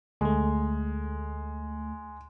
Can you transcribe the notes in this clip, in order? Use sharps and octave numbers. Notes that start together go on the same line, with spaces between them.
D2 G#3 A3